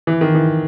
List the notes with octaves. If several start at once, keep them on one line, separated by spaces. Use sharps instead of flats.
E3
D#3
E3